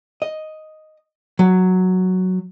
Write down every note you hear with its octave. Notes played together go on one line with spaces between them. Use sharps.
D#5
F#3